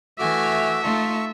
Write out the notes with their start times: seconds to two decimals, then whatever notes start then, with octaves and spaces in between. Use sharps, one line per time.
0.19 E3 A3 F#4 E5 G#5 D6 F6
0.83 A3 D#4 F4 A5 C#6